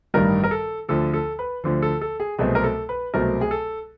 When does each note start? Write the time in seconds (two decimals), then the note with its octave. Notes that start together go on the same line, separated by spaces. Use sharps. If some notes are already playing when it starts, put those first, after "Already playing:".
0.14 A1 G2 D#3 G3 A#4
0.44 A#4
0.51 A4
0.88 D2 D3 F3 A4
1.14 A4
1.39 B4
1.64 D2 D3 F3 C5
1.82 A4
2.01 A4
2.20 G#4
2.38 C2 B2 F#3 A3 C4 G#4
2.55 A#4
2.64 A4
2.89 B4
3.14 C2 B2 F#3 A3 C4 A#4
3.41 G#4
3.51 A4